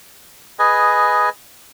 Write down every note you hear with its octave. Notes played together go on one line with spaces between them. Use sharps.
G#4 B4 D#5 G#5